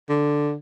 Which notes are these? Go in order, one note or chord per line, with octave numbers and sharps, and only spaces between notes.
D3